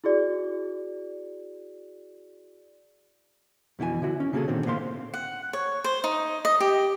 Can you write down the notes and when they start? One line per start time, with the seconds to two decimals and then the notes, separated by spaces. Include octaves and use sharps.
0.04 E4 F#4 G#4 D5
3.79 F2 B2 E3 F4 G#5
4.02 D3 E4 F#4
4.20 C#4
4.33 C#3 A#3 C#4 F#4 G#4 A4
4.48 A#2 D3 D#3 C4
4.65 A2 A#3 C5 F5 C6
5.14 F#5
5.53 C#5
5.84 C5
6.04 D#4
6.45 D#5
6.60 G4